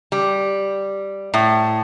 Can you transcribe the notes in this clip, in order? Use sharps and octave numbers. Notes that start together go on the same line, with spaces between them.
G3
A2